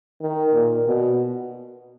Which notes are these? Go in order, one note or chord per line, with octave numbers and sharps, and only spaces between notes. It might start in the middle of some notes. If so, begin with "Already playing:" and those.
D#3
A#2
B2